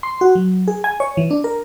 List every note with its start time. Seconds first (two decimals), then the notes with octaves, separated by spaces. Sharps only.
0.03 C6
0.21 F#4
0.35 F#3
0.68 G#4
0.84 G#5
1.00 C#5
1.17 E3
1.31 D4
1.44 A#4